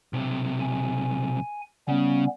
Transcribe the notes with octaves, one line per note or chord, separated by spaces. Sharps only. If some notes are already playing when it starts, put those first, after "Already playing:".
B1 C3
G#5
C#3 G3 B3 C#4